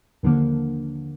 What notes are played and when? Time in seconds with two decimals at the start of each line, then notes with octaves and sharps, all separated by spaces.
0.23 D#2 D3 F3 A#3